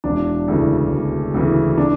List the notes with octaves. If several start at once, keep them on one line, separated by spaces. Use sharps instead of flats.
E1 D4
D2 C#3 E3
E1
D2 C#3 E3
D4